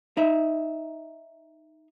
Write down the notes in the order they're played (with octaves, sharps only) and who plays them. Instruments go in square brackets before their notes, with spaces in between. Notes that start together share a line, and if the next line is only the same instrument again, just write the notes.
[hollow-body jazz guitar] D#4 E5